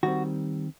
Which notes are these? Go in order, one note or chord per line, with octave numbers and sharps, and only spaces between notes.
D#3 G3 C4 F#4